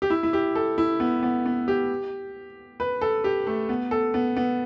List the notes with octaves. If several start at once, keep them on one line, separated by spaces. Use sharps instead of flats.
G4
E4
E4
G4
A4
E4
B3
B3
B3
G4
B4
A4
G4
A3
B3
A4
B3
B3